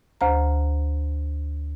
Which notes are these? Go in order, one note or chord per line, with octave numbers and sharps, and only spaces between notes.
D2 C5 A#5